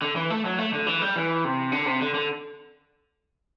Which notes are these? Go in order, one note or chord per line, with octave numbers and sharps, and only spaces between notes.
D3
E3
A3
F#3
A3
D3
E3
G3
E3
C3
D3
C3
D3
D3